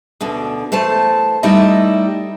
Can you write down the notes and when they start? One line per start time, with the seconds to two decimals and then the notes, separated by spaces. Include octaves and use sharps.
0.21 D2 B2 D3
0.72 E3 A3 C5 A5
1.43 G3 A3 D#4 E4 D#5 E5